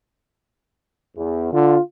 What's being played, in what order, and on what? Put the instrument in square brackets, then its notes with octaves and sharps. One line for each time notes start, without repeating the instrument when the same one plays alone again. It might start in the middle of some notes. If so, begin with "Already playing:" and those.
[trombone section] E2
[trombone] D3 [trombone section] F4